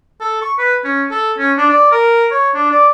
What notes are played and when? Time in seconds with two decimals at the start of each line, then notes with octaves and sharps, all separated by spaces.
0.20 A4
0.42 C#6
0.58 B4
0.84 C#4
1.11 A4
1.38 C#4
1.57 D4
1.70 D5
1.92 A#4
2.31 C#5
2.54 D4
2.71 D5